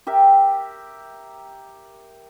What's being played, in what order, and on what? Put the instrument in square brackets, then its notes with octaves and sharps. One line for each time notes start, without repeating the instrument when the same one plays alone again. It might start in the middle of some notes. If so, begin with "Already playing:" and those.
[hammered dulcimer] G4 A#4 E5